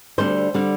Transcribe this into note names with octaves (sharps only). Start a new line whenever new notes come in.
D2 D3 G3 D4 C5
D3 G3 D4